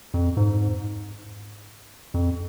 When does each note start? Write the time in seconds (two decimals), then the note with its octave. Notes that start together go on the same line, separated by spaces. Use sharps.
0.14 F2
0.37 G#2
2.14 F2